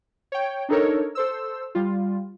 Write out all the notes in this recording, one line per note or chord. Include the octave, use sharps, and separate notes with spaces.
C#5 G5
D4 D#4 A4 A#4 C#5
A4 C5 E6
G3 F4